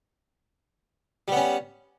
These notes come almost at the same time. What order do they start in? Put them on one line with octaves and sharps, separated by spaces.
G3 B3 C#4